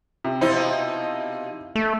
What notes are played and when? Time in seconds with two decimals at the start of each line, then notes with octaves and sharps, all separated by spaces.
0.24 C3
0.41 B2 F3 D#4 E4 C5
1.75 A3